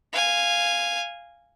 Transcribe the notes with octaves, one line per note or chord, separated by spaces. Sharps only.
F5 G#5